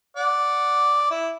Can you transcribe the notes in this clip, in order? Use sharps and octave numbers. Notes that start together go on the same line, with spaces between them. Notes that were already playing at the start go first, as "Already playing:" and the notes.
D5 F#5
E4